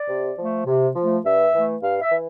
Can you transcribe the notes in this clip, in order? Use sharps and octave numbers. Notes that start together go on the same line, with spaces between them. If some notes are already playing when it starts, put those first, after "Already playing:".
Already playing: D5
C3
F3 A3
C3
F3 A3
G2 E5
E3 A3
G2 F5
E5
E3